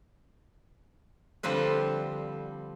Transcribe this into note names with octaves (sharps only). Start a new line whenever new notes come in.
D3 F3 G3 C4 B4